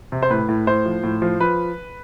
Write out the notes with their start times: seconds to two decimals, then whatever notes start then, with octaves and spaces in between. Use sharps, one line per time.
0.12 C3
0.23 C5
0.30 A2 B4
0.49 A2
0.67 A2 C5
0.86 F3
1.03 A2
1.22 F3
1.40 F3 B4